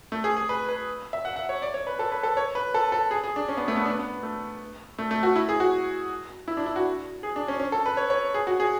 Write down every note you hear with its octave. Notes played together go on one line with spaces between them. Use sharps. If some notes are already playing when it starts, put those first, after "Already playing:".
A3
G#4
G#4
B4
B4
E5
F#5
F#5
C#5
D5
C#5
B4
A4
B4
A4
C#5
B4
A4
A4
G#4
G#4
D4
C#4
B3
A3
B3
D4
B3
A3
A3
A3
F#4
E4
G#4
F#4
E4
D4
E4
F#4
G#4
D4
C#4
C#4
A4
B4
C#5
C#5
G#4
F#4
G#4